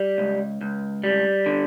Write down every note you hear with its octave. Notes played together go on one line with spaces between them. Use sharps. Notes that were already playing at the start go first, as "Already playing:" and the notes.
Already playing: G3
C#2
C#2
G3
D3